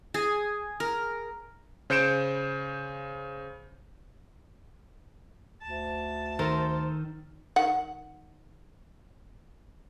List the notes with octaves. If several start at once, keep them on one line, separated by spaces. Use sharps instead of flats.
G#4
A#4
C#3 C5 G6 C#7 D7 E7
D2 A5
D#3 A4 A#4 C5
D#3 F#5